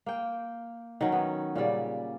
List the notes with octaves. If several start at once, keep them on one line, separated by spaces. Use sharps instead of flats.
A#3 G5
D#3 F#3 C#4
B3
A#2 C#3 G3 D5